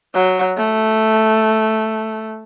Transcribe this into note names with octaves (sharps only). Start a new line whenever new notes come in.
F#3
A3